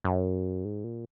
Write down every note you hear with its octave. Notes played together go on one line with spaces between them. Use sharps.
F#2
G#2
A#2